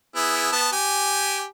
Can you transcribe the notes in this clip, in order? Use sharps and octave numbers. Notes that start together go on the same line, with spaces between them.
B3 E4 G#4
B3 A5
G4 G#5